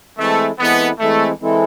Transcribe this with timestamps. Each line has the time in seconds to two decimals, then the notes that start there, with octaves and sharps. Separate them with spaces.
0.18 E3 G#3 A3 C4 E4 A4
0.59 E3 G#3 B3 C4 E4 A4
1.00 E3 G#3 A3 C4 E4 A4
1.41 E3 G#3 C4 E4 A4